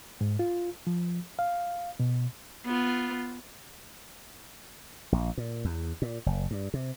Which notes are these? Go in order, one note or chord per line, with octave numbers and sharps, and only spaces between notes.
G#2
F4
F3
F5
B2
B3 F4
A#1
A#2
E2
A#2
F#1
G2
C3